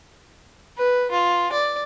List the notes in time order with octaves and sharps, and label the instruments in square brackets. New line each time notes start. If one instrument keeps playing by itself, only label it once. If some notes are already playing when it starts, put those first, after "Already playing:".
[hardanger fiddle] B4
F4
D5